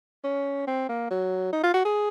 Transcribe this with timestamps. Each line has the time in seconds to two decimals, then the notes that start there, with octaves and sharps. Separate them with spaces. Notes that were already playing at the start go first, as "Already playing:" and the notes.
0.24 C#4
0.67 C4
0.89 A#3
1.10 F#3
1.53 D#4
1.63 F4
1.74 F#4
1.85 G#4